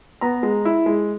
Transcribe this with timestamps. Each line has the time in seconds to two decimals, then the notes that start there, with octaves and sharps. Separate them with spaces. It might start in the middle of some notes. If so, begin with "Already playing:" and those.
0.21 B3 A#5
0.43 G#3
0.65 E4
0.86 G#3